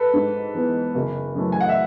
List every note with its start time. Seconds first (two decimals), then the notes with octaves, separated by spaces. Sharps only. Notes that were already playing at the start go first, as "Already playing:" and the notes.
Already playing: A4 B4
0.13 G#2
0.54 E3 B3
0.95 F#1
1.35 F#2 E3 A3
1.52 G#5
1.61 F#5
1.69 E5